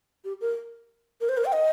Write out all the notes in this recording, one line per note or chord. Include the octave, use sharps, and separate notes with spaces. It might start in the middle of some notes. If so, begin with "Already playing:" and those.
G4
A#4
A#4
C5
A#4
G5
D#5